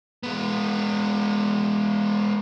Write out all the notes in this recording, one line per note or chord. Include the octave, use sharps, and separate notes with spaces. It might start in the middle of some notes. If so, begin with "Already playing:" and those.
G#3 B3